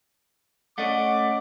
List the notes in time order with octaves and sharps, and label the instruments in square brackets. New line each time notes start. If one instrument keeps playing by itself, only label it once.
[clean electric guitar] A3 [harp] C#4 D5 D#5 [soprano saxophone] F#5 [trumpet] D6